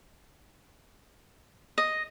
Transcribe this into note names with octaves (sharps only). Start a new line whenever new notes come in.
D#5